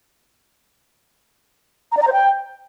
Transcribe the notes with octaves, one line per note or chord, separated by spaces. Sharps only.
A#5
D5
A#5
C5
G5